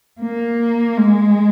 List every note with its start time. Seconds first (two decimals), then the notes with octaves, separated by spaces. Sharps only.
0.21 A#3
0.98 G#3